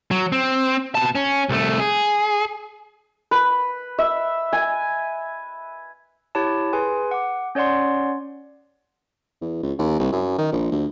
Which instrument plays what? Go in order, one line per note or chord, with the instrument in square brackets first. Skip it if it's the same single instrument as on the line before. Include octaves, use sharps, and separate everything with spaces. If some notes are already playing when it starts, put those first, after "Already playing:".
[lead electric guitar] F#3
C4
B2 A5
C#4
C2 A3
G#4
[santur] B4
E5
G#5
[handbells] E4 G4 C#5 A5
G#4 B4 G#5 C6
F#5 D6
C#4 C#5 D5 F#5 C6
[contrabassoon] E2
C#2
D#2
C2
F#2
D#3
A#1
D2